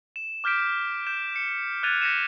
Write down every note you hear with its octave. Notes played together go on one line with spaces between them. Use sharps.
E7
D6 F6 G6 B6 D7
G6 E7
C#7
F6 F#6 G#6 A6 D#7 F7
G6 A#6 B6 C#7 D#7 E7